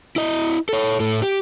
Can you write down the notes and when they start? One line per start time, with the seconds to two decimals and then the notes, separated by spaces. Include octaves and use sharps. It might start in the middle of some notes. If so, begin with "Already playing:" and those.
0.16 E4 D#5
0.69 A4 C#5
1.00 A2 A4
1.22 G4